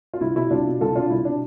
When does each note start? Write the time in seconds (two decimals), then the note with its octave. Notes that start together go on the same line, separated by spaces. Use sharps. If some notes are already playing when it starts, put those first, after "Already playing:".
0.14 F4
0.21 C2 E4
0.35 B2 E4
0.50 C2 D4 F4
0.66 B2
0.81 C2 F4 A4
0.95 B2 D4 F4
1.10 C2 E4
1.25 B2 D4